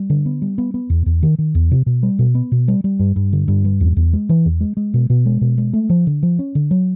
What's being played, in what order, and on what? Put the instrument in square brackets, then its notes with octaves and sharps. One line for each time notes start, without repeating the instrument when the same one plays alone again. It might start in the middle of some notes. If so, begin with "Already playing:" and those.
Already playing: [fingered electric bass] G3
D3
B3
G3
B3
B3
E2
E2
D#3
D#3
E2
C3
B2
G3
B2
B3
B2
G3
G3
G2
G2
D3
G2
G3
E2
E2
G#3
E3
E2
G#3
G#3
B2
B2
G#3
B2
G#3
A3
F3
D3
F3
C#4
D3
F#3